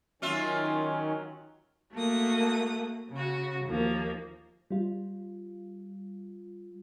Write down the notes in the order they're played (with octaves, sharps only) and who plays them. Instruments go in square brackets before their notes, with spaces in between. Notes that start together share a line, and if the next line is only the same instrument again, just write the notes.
[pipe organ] D#3 C#4 [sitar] F#3 F4 E5
[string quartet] A3 A#3 F#4 A4 D#6
C#3 F#4
D#2 F3 A#3
[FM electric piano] G3 F4